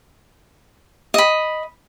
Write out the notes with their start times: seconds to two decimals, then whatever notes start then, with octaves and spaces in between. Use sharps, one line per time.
1.14 D#5 B5